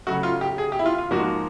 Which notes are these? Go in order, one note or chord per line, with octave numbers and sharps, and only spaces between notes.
C#3 F#3 A3 F#4
F4
G4
G#4
G4
E4
F4
F4
G#2 F3 A#3 F#4